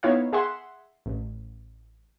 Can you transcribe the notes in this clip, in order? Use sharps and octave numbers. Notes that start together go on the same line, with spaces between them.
B3 D#4 E4 C#5 F5
G#4 E5 F#5 C6
A1